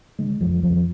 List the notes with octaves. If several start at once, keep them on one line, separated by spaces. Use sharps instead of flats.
D3 G#3
F2 F3
F2 F3